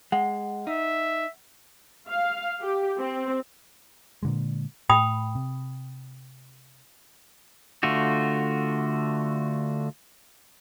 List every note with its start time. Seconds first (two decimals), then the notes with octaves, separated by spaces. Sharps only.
0.12 G#3 F#5
0.67 D#4 E5
2.09 F5
2.61 G4
2.99 C4
4.23 A#2 D3 G#3
4.90 A2 G5 B5 D#6
5.35 C3
7.83 D3 A3 F4 F#4